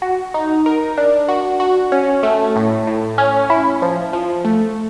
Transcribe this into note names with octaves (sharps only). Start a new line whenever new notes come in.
F#4
D#4
A#4
D4
F#4
F#4
C#4
A3
A2
A2
C#4
E4
F3
F3
A3